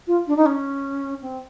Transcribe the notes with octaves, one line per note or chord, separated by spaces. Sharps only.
F4
D4
D#4
C#4
C4